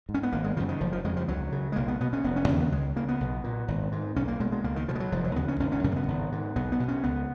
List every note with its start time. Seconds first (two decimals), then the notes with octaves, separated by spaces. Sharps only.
0.09 G#2
0.14 C#4
0.23 B3
0.32 G#1 A#3
0.44 G#3
0.57 F#2 C#3 F3
0.69 D#3
0.81 F#1 F3
0.93 F3
1.04 F2 C#3 G#3
1.17 F3
1.28 C#2 F#3
1.52 C#3
1.72 G#3
1.76 B1 A#3
1.88 B3
2.01 B2 B3
2.13 C#4
2.24 F1 B3
2.36 C#4
2.48 D#2 C#3 C#4
2.60 B3
2.72 C#2 G#3
2.96 C#3 A#3
3.09 B3
3.20 B1
3.44 A#2
3.68 G#1
3.92 G#2
4.16 B1 C#4
4.28 A#3
4.40 B2 G#3
4.52 G#3
4.64 C#2 A#3
4.76 D#3
4.88 B2 F3
4.95 G#3
5.00 F#3
5.12 F1 F3
5.24 F#3
5.36 D#2 C#3 B3
5.48 C#4
5.59 G#1 C#4
5.72 C#4
5.84 F#2 C#3 C#4
5.92 A#3
5.96 B3
6.08 G#1
6.32 G#2
6.56 B1 B3
6.72 B3
6.80 B2
6.88 C#4
7.03 C#2 B3